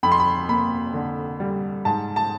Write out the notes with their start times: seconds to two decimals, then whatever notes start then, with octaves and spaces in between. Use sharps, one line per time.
0.03 F2 B5
0.12 C6
0.20 B5
0.48 A#3 B5
0.94 D3
1.40 G3
1.85 G#2 A5
2.16 A5